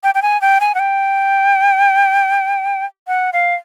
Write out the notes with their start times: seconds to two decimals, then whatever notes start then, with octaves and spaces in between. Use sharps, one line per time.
0.03 G5
0.15 G5
0.22 G#5
0.41 G5
0.60 G#5
0.75 F#5
0.79 G5
3.07 F#5
3.33 F5